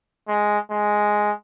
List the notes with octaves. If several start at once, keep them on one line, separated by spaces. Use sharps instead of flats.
G#3
G#3